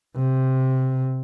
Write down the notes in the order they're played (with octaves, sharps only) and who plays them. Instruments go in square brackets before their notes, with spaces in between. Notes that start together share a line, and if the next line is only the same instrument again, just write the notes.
[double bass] C3